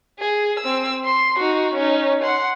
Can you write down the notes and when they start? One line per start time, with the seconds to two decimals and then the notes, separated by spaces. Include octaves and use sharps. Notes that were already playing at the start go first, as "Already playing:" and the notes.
0.20 G#4
0.60 C4 E6
1.05 C6
1.39 D#4 F#4
1.74 C#4 D#4
2.24 F#5 C6